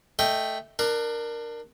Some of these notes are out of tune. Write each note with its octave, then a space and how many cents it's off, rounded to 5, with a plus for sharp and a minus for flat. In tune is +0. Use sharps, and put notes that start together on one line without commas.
A3 +0 D#5 -10 G5 +0
D4 +25 A#4 +0